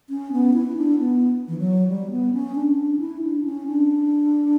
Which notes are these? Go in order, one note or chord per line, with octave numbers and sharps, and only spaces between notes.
C#4
B3
E4
D4
B3
E3
F#3
G3
B3
C#4
D4
D4
E4
D4
C#4
D4